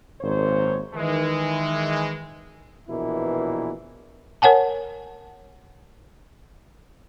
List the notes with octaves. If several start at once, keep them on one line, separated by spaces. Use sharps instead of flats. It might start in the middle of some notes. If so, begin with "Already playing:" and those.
G#1 A#2 C5 C#5
D#3 E3 G#3
A#1 B2 E3 A#3 E4
A#4 C#5 F#5 G#5 A5